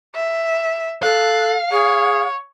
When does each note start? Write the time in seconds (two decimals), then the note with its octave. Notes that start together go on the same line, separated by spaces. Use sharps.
0.15 E5
1.03 A4 F5 F#6
1.71 G#4 C#5